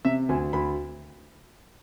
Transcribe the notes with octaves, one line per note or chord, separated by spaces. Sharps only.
C3 E5
D2 G#5
D2 B5